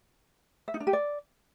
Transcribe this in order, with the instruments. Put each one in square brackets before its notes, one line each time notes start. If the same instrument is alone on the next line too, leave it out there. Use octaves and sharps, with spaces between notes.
[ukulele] E5
D#4
D4
G4
D5